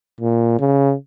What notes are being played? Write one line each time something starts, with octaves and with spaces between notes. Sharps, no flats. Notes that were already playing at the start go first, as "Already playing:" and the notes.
A#2
C#3